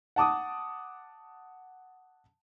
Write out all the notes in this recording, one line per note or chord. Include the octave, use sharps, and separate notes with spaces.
F#5 A5 D6 D#6